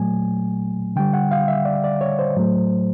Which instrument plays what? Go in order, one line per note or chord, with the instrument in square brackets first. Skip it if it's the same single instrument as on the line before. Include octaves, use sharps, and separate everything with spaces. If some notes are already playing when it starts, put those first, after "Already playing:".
Already playing: [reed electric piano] A#2 F#3 A3 G#5
D3 G3 G5
F#5
F5
E5
D5
D5
C#5
C5
A2 F#3 A3